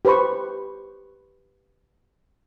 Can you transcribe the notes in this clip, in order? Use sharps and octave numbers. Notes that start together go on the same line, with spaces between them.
G4 B4 C5 B5 C#6